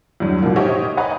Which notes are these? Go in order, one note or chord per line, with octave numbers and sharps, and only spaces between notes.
E2 G2 F#3
C#2 G#2 B2 F3 A#3
D#4 G4 C5 C#5 D#5 E5
B4 C#5 D#5 F#5 G#5 A#5